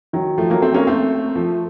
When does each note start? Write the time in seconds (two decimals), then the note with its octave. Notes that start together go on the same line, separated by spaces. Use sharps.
0.13 D#3 F#3
0.38 F3 A3
0.50 F#3 A#3
0.62 A3 C4
0.74 A#3 C#4
0.87 A3 C4
1.35 F3 A3